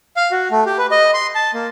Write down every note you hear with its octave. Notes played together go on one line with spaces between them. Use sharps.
F5
F#4
A3
G4
B4
D#5
C6
A5
A#3